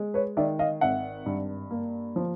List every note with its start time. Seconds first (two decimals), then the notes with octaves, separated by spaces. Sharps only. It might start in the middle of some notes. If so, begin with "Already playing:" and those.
Already playing: G#3
0.14 B4 C#5
0.37 D#3 D5 E5
0.59 D#5 F5
0.81 G#1 E5 F#5
1.26 G2
1.71 A#3
2.16 F3